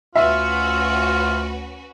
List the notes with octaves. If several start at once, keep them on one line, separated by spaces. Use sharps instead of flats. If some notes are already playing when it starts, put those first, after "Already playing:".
D2 C#4 F4 F#4 B4 E5